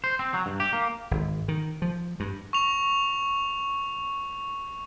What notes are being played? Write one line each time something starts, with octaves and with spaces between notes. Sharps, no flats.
C5
C4
F#3
G2
G4
A#3
G#1
D#3
F3
G2
C#6 F7